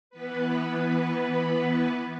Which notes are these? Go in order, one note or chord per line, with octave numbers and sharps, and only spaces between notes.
E3 B3 B4